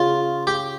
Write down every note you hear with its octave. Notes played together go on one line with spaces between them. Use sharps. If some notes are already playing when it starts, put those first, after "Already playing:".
Already playing: C#3 F4
G4